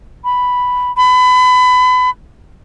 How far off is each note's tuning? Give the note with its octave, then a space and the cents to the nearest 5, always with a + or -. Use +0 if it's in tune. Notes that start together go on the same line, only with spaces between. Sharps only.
B5 +5
B5 +30